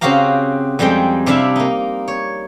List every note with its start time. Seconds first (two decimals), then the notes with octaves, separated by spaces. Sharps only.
0.01 C#3 C4 F#4 G4 F5 A#5
0.79 F2 G3 G#3 C4 G5
1.26 C3 D4 E4 E5 F5
1.56 A#3 D#4
2.08 C#5